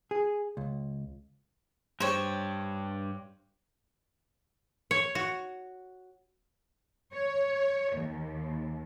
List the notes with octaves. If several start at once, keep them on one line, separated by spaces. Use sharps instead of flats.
G#4
C#2
G2 G4 C5 C#5
C#5
F#4
C#5
D#2